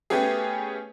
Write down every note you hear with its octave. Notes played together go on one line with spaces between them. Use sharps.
A3 B3 C#4 G4 G#4